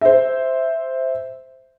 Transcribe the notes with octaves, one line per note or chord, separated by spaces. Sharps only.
C5 E5